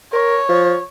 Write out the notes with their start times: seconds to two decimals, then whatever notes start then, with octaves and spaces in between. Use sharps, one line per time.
0.13 A#4 C#5
0.49 F3